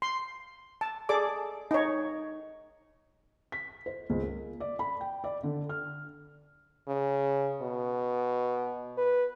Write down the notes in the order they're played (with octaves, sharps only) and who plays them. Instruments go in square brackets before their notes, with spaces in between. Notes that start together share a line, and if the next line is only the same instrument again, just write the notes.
[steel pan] C6
A5
G#4 A4 D5 D6
D#4 C#5
[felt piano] B6
C5
C#2
A#3
D5
B5
G5
D5
D3
F6
[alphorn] C#3
B2
B4